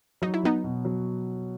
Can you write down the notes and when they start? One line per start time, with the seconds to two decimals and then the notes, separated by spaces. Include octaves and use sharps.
0.22 F#3 D#4
0.34 E4
0.43 F#3 B3 D#4
0.64 B2
0.85 F#3